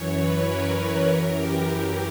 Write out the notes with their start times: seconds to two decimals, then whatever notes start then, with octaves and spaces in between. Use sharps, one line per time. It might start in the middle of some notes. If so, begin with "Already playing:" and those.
Already playing: F#2 E3 C#5
0.18 B4
0.47 A#4
0.76 A#4
1.05 F#2 E3
1.34 G4